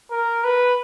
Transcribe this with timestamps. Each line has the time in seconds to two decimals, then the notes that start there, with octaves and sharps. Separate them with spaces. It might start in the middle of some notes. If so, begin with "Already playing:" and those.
0.11 A#4
0.44 B4